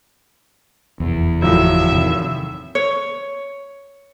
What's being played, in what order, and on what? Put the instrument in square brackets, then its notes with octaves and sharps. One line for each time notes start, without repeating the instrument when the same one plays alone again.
[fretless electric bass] F1 [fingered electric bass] E2
[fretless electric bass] F#1 [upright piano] A2 F3 F#3 [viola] E5
[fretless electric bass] C3 D#3
[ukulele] C#5